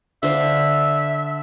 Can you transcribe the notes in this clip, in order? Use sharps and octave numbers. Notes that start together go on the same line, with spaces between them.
D3 C5 E5 F5